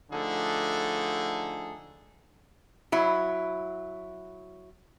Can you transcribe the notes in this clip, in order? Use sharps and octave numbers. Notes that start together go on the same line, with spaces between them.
D3 F3 A3 D#4 G#4 A4
F#3 E4